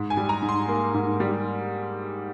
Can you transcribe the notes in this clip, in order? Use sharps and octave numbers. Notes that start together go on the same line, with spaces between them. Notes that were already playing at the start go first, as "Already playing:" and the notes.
Already playing: G#2
G#5
G3
A#5
G#2
C6
A#3
G#2
G3